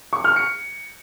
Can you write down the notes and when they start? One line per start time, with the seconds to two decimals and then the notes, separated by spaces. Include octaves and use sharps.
0.13 C#6
0.24 F6
0.36 C#7